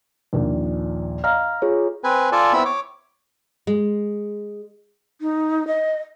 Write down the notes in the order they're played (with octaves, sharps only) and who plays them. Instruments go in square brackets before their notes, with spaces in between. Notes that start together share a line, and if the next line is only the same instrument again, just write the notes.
[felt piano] A#1 D#2 A#2
[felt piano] D#5 F5 A#5 [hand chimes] F6
[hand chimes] F4 G#4 C#5
[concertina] C4 B4 G#5
F4 A4 D5 G#5 A5
B3 C4 E4 B5 E6
C#5 D6
[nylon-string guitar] G#3
[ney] D#4
D#5